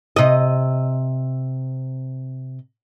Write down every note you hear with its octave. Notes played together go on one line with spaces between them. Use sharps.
C3 D#5